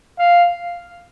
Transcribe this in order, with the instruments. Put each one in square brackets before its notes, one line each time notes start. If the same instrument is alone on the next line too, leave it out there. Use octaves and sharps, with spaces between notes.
[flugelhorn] F5